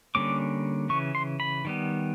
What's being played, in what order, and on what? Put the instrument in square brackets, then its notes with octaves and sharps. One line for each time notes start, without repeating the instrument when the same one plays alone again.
[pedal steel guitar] D3 G3 A#3 C#4 D6
C#3 E3 C#6
C6
B5
D#3 G3 B3